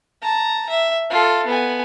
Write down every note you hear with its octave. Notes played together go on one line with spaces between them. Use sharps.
A5 A#5
E5
F4 A4
B3 G#5